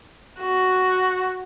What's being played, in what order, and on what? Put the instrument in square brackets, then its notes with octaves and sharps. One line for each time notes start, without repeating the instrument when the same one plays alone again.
[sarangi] F#4